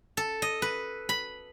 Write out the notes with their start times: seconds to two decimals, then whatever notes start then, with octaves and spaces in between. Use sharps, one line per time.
0.17 A4
0.42 D#5
0.62 B4
1.09 B5